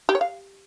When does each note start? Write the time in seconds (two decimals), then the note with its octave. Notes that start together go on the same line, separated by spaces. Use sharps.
0.09 G4
0.15 C#5
0.21 F5